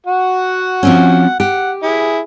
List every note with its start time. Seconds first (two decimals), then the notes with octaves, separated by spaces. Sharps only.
0.07 F#4 F#5
0.83 F3 C4 C#4
1.40 G4 F#5
1.83 E4 G#4